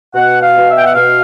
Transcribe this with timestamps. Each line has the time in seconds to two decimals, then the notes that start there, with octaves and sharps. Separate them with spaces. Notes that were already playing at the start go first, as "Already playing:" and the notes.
0.14 B2 F#5
0.42 F5
0.56 B2
0.69 E5
0.78 G5
0.86 F#5
0.95 B2 F5